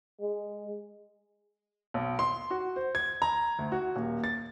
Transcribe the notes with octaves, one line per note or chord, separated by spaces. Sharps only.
G#3
B1
C6
F#4
C5
G#6
A#5
D2
F#4
D#1
A6